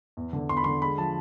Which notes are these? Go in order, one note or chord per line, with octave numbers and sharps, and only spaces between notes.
E2
D3
E2 C6
B5
D3 C6
G#3 B5
F3 A5